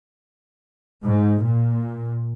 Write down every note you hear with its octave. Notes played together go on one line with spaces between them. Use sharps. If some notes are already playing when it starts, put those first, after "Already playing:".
G#2
A#2